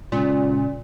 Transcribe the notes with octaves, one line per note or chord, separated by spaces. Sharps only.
C#2 A#2